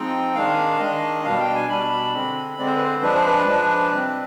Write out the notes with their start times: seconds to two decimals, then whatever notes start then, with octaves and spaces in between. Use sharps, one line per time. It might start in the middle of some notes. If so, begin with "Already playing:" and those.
Already playing: F3 G#3 C4 D#4 G5
0.35 D#3 G#3 D4 F5
0.80 D#3 G#3 D4 D#5
1.25 B2 G3 D4 F5
1.40 G5
1.55 G#5
1.69 B2 G3 D4 B5
2.14 D3 G#3 C4
2.58 D3 G#3 C4 D5
2.67 C5
2.76 B4
2.84 C5
3.02 F3 G#3 D4 B4
3.15 C5
3.26 B4
3.47 F3 G#3 D4
3.91 C3 G3 C4